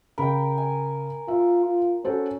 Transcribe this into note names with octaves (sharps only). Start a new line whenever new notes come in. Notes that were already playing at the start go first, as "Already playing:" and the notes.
C#3 A#4 G5 B5
G#5
F4 E5
F4
C#4 F#4 A4 C5